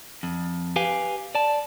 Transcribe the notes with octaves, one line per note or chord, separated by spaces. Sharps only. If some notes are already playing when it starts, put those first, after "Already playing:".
F2
G4 B4 F5 G#5
D5 A5